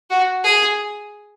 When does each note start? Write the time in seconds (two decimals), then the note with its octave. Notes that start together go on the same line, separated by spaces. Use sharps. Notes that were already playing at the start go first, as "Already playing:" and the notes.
0.10 F#4
0.44 G#4